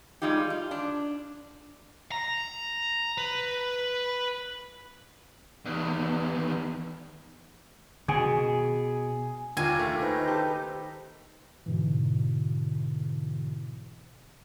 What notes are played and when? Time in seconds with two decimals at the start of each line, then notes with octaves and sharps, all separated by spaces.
0.22 G3 G#3 D#4 F4 G4
0.50 F4
0.71 D4
2.12 A#5
3.18 B4
5.65 E2 D#3
8.08 B2 G#4
9.57 D#2 D4 F4 G#5
9.79 A3
10.00 D#4 B4 C5
10.27 G4 A4
11.66 G#2 B2 D3 E3